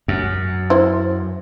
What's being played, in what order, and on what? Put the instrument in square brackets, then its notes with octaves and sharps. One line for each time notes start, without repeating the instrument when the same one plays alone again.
[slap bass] F#2
[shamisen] E4 C5